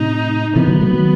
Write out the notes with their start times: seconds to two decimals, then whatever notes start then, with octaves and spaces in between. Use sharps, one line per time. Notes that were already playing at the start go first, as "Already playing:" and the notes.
Already playing: A2 C3 D#4
0.56 C3 E3 B3
0.68 D#3 F#3
0.81 F#3 A3
0.93 D#3 F#3